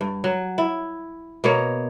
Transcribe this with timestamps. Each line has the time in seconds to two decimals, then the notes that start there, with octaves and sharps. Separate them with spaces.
0.01 G2
0.24 F#3
0.58 E4
1.44 B2 A#3 C#5